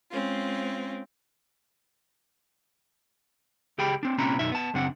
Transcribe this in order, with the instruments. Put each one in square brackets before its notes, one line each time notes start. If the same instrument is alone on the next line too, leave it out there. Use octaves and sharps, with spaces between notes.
[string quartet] G#3 C4 C#4 F4
[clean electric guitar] C#2 G4 G#4 G5 B5
C4 D4
C2 A#2 C4 C#4 A#5 B5
F#2 B2 D#4 E5
B3 A5
F#2 C#3 C4 D4 F#5